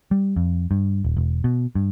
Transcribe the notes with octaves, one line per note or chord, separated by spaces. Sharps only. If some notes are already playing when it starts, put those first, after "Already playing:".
G3
F2
G2
D#1
E1
B2
G2